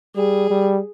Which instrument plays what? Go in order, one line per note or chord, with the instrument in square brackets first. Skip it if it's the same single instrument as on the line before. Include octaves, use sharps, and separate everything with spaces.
[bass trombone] G3 [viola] G#4
[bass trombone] G3